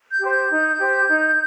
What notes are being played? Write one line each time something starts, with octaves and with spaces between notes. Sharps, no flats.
G6
G4 C5
G6
D#4
G4 C5
D#4